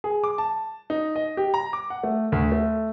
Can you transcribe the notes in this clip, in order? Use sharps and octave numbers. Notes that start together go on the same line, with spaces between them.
G#4
D6
A5
D#4
D#5
G4
A#5
D6
F#5
A3
D2
A3